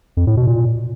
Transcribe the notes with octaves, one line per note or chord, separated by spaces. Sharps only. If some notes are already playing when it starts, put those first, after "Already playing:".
F2
A2
B2
A#2